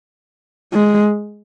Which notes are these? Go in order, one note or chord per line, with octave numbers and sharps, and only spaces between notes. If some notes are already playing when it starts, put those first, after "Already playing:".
G#3